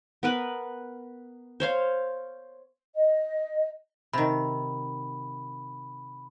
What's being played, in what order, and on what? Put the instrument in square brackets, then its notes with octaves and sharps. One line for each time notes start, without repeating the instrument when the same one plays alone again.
[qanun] B3 A#4 B4
C5 C#5 F5
[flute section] D#5
[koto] C3 D#3 [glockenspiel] B5